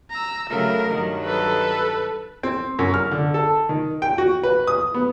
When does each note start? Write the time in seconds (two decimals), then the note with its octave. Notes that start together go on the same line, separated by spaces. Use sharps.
0.11 A#5 E6
0.49 C#3 F#3 A3 A#4
0.88 G2 D#3 F#3
1.24 A4 B4
2.43 C4
2.79 F#2
2.94 F6
3.11 D3
3.34 A4
3.69 D#3
4.02 G5
4.18 F#4
4.43 B4
4.67 D#6
4.95 B3